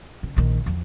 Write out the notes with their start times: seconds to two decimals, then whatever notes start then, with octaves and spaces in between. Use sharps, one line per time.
0.23 C#3
0.36 A#1 D#3
0.66 E2 F3